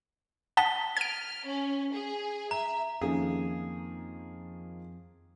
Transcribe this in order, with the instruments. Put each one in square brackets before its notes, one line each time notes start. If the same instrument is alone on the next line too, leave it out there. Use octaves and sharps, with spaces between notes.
[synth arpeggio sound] F#5 A5 D#6 [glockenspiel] B6 G7
[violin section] F6 [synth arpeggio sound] G#6 D7
[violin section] C#4
G#4
[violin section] E5 [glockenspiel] A#5
[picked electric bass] F2 [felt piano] D#3 F3 A#3 [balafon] C#4 A4 F5 [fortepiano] G#4